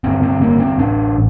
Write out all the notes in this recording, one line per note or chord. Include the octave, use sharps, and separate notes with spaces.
G1 G2 D3 C4
C4
A#3
C4
A1 A2 D4